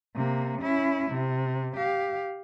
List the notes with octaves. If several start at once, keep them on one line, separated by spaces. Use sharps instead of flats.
C3 A#3
C#4 E4
C3
G4 F5